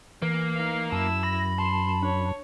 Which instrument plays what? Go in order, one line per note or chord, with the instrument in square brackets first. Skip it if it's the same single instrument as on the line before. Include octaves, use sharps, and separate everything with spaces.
[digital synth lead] E3 [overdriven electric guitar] A#3
[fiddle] D#4 F5
[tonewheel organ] F#2 [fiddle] E4 E6 [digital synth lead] A5
[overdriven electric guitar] B5 [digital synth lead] A#6
[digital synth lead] A5 [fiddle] C6
[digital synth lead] D4 [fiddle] C#5